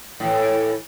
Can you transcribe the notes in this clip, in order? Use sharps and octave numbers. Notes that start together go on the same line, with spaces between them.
A2 E3